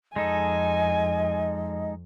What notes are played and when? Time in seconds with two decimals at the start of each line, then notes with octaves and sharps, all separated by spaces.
0.16 F2 G#3 D#4 A4 D#5 G#5